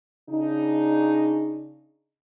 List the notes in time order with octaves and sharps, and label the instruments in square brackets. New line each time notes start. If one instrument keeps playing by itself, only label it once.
[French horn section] C#3 D4 D#4